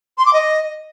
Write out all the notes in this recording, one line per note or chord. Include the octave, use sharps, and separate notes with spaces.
C6
D6
D#5